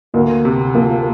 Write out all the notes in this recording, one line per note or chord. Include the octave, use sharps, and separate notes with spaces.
D2 A#3
C3
F3 A#3